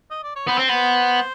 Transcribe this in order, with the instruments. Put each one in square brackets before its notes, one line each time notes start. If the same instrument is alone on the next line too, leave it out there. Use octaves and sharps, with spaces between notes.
[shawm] D#5
D5
C#5
[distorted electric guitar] B3 [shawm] C5
[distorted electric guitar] C4
B3